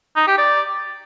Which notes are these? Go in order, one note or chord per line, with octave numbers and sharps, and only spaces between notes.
D#4
G4
D5